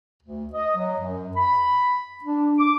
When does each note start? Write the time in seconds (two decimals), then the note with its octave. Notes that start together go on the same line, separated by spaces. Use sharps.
0.23 D2
0.53 D#5
0.76 F#3
0.99 F#2
1.37 B5
2.24 D4
2.58 D6